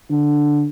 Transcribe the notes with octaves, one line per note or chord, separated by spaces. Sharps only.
D3